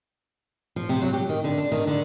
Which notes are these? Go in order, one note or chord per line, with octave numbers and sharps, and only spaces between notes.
F3
C3
F#3
G4
D#3
D3
D4
D#3
D3